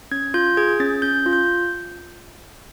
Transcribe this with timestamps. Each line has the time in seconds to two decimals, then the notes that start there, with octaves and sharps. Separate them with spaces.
0.11 C#4 G#6
0.34 F4 G6
0.57 G#4 G#6
0.80 C#4 A6
1.02 C#4 G6
1.26 F4
1.33 G6